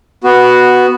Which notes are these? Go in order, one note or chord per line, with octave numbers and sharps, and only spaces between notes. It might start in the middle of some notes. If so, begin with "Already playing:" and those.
B3 F#4